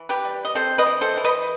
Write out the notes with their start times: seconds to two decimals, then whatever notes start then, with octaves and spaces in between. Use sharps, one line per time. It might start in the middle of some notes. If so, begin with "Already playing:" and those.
Already playing: E3
0.09 G4 B4
0.25 G3
0.45 D#5
0.55 C4 A4 C5
0.78 B4 D#5
0.86 E3
1.01 A4 C5
1.17 E3
1.24 B4 D#5